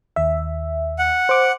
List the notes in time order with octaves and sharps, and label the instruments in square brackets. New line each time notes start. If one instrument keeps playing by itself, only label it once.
[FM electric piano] D#2 E5
[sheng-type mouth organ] F#5
[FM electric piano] C5 D6